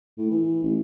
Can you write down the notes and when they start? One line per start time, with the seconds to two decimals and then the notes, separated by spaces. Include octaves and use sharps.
0.18 A2
0.31 E3
0.63 A1